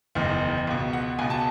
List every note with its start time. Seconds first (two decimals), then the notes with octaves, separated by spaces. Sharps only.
0.15 F#1 E2 D#3
0.67 C#2 B2
0.93 F#5
1.19 C#2 B2 G#5
1.30 A5